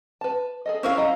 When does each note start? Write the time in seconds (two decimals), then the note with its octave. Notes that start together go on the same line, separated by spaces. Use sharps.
0.21 B4 A5
0.66 G#4 A4 D#5
0.83 C#4 E4 A#4 C5 F5
0.97 F#3 D#5 A#5